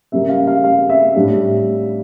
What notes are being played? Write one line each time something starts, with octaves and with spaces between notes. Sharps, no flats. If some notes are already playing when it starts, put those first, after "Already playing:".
C#3 G3 A#3 E5
F5
F5
F5
E5
A2 G3 D4